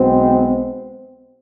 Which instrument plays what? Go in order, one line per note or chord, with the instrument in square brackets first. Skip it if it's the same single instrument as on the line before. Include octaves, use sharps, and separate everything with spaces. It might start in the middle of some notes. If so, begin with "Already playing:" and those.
Already playing: [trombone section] B1 B2 G#3 B3 C4